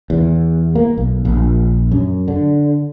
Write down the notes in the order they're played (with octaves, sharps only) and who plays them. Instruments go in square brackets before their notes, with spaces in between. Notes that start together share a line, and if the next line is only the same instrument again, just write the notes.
[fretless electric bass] E2
A#3
B1
A#1
F#2
D3